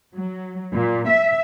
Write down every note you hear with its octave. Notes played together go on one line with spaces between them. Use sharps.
F#3
A#2
E5